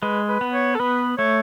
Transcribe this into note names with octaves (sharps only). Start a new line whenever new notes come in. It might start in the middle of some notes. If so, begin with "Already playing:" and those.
G#3 B4
B4
B3
C#5
A4
B3 B4
A3 C#5